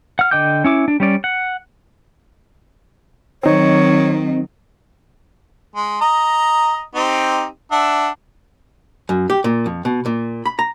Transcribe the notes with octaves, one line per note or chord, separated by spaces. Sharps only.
F#5 F6
D3 D#5 G5 D6 G6
C#4 E4 D6
D4
G3 C#4 D5
F#5
D#3 F#3 C4 D#4 C#5
G#3
D#5 A#5
C4 D#4 G4
D4 E5 F#5
F#2
G4
A#2
F2
B2
A#2
B5
A#5